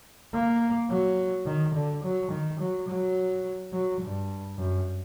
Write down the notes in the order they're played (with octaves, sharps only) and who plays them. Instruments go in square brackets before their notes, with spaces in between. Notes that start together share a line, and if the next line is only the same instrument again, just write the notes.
[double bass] A#3
F#3
D#3
D3
F#3
D#3
F#3
F#3
F#3
G2
F#2